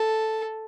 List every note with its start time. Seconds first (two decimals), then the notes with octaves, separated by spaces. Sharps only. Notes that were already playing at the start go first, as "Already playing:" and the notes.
Already playing: A4